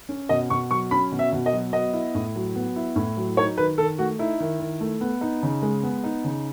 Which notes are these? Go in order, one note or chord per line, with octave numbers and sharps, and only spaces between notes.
C#4
B2 D#5
B2 C#6
F#3 C#6
C#4 B5
B2
E5
B2
D#5
F#3
B3 D#5
E4
A2
F#3
B3
E4
A2
F#3
D#4 C#5
D#3 B4
D#3 A4
A3 F#4
D#4 E4
D#3
D#3
A3
B3
D#4
C#3
G#3
B3
D#4
C#3